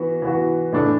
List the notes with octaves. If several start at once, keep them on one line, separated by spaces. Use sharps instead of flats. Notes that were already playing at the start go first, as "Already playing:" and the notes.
Already playing: E3 B3 F#4
E3 B3 F#4
A2 E3 D4 A4